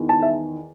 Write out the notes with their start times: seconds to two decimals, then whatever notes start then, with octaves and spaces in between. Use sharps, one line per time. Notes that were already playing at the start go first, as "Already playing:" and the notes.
Already playing: E2 D#3
0.09 A5
0.22 E5